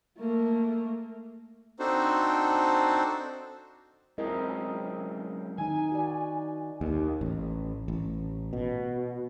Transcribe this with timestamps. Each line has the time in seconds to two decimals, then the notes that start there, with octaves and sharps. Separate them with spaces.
0.19 A3 A#3
1.79 C4 D4 D#4 F#4 A4 C5
4.18 F#2 G#3 C4 E4 A#4 D#5
5.58 D#3 D#4 G#5
5.92 F#4 D5
6.81 D#2
7.21 A1
7.88 A1
8.53 B2